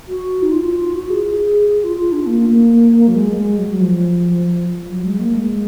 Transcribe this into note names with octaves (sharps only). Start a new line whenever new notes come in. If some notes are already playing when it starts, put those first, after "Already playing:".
F#4
D#4
F4
F#4
G#4
G#4
G#4
F4
F4
D4
A#3
A#3
F#3
G#3
G#3
F#3
F3
F#3
G#3
A#3
G#3